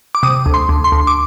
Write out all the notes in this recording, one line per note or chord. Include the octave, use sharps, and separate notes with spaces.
D6
C3 D#6
D2
C6
D2
C6
D2
D6